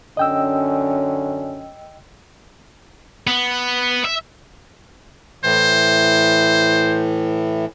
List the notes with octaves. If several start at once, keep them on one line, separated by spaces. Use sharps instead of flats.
F#2 D3 C#4 D#5 G5 E6
B3
E5
A2 E3 C5